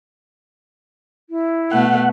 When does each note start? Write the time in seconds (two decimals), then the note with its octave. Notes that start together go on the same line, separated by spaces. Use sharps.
1.30 E4
1.72 B2 A3 F#5